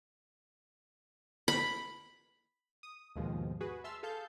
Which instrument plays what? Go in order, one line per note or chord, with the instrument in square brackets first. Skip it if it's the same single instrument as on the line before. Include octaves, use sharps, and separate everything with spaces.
[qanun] B5
[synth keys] D#6
D#2 G#2 B2 D#3 F3 G#3
F#4 G#4 B4
E5 A5 C6 E6 F6
G#4 A4 F5 A5 G6